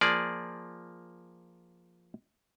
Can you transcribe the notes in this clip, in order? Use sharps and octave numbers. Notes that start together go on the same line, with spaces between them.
F3 A#3 G#4 D5